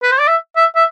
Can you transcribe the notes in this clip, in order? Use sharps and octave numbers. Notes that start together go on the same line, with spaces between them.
B4
C5
D5
E5
E5
E5